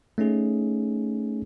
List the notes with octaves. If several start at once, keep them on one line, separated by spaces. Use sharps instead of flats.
A3 C#4 D#4 G#4